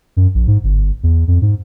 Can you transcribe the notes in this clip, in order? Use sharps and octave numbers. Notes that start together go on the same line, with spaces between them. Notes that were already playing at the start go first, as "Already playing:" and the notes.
F#2
A#1
G#2
G1
E2
F2
G#2